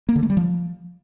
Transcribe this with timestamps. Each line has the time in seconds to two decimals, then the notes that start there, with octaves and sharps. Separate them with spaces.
0.09 A#3
0.16 D3
0.23 A3
0.30 G3
0.37 F3